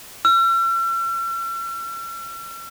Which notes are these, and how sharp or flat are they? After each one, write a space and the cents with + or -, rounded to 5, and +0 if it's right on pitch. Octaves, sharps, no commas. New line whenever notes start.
E6 +45